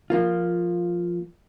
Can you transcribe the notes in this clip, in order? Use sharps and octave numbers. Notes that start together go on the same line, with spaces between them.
F3 A#3 F4